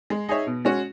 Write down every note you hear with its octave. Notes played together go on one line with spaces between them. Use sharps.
G#3
D#4 G#4 C#5 E5
B2
G#3 C#4 F#4